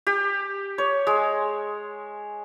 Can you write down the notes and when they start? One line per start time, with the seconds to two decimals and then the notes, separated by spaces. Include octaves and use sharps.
0.07 G4
0.78 C#5
1.07 G#3